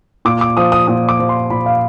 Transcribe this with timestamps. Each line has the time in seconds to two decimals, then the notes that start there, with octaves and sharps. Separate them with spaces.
0.25 A#2 D6
0.41 D6
0.57 F3 D#6
0.72 D#6
0.87 A#2 D#6
1.09 D6
1.20 F3
1.29 C6
1.50 A#2 B5
1.66 F5